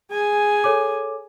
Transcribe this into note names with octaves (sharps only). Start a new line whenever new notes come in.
G#4 G#5
A4 C#5 D6